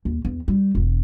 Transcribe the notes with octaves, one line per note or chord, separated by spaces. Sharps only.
D#2
E2
G3
E1